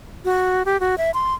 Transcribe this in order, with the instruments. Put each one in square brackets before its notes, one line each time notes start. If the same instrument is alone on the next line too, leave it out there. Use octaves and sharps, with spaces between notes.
[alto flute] F#4
G4
F#4
E5
C6